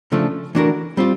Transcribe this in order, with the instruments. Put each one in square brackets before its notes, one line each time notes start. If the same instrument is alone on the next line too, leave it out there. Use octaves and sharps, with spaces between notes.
[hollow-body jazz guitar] C#3 F3 A3 D4
E3 A3 D4 F#4 A#4
G3 C4 F4